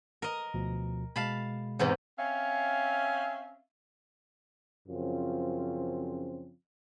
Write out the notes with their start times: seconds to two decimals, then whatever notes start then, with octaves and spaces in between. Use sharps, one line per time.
0.22 A#4 D#5
0.54 D2 B2 F3
1.16 B2 G#3 F5 A5 B5
1.79 E2 G#2 C3
2.17 C4 C#4 E5 F5
4.88 F#2 C#3 F3 C4 C#4 F4